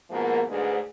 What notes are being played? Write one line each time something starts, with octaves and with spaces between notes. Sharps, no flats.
G#2 B2 F3 A#3
D2 G#2 G#3 D4 G#4 B4